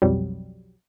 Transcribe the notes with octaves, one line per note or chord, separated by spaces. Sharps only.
B1 F2 F#3 G3